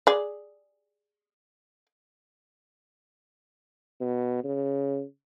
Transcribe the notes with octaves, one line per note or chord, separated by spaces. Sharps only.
G#4 D5
B2
C#3